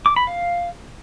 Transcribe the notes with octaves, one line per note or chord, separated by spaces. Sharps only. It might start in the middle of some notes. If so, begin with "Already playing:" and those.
D6
B5
F5